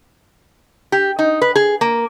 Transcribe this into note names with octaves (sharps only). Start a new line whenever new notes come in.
G4
D#4
B4
G#4
A#3